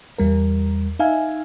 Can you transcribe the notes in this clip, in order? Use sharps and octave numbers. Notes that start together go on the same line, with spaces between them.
E2 G3 A#4
D#4 E5 F5 G#5